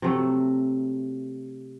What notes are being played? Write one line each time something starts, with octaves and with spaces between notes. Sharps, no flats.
C3 F#3 A3